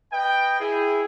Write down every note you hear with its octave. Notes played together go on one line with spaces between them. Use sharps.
B4 D#5 G5
E4 G#4